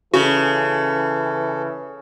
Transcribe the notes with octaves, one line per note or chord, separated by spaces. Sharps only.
C#3 E3 F#4 A4